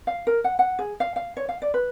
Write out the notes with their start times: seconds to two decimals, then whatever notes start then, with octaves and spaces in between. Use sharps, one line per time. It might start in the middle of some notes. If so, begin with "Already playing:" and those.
0.07 F5
0.27 A#4
0.44 F#5
0.59 F#5
0.79 G#4
1.00 F5
1.16 F5
1.37 C#5
1.49 F5
1.62 D5
1.74 B4